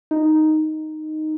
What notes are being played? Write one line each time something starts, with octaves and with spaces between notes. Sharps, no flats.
D#4